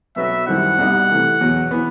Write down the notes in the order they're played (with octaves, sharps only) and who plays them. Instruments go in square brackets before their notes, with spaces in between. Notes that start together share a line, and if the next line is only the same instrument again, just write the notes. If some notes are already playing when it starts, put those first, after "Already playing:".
[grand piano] B1 B2 F#3 B3 F#4 [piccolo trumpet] E5
[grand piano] F#2 D#3 G3 C4 E4 [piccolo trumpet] F#5
[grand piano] C2 B2 G3 D#4
C3 E3 A3
E2 B2 F#3
E3 B3